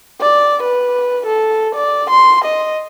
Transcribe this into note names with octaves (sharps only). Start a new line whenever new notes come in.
D5
B4
A4
D5
C6
D#5